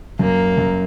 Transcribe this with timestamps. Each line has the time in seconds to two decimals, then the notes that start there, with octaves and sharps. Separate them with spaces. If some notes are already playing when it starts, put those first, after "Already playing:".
0.19 F#2 A#3
0.58 F#2